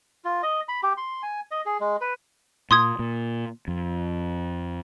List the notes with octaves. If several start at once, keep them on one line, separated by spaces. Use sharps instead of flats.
F4
D#5
B5
G4
C6
G#5
D#5
G#4
G#3
B4
A#2 C6 D#6 G#6
A#2
F2